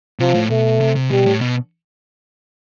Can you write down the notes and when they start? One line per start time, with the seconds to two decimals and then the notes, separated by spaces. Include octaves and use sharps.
0.19 C3 F3
0.34 A2
0.50 B2 A3
0.81 C3
0.96 C3
1.11 B2 G3
1.26 A2
1.41 B2